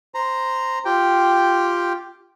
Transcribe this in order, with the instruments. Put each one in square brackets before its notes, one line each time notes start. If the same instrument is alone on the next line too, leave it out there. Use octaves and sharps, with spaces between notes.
[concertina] C5 A#5
F4 G4 G5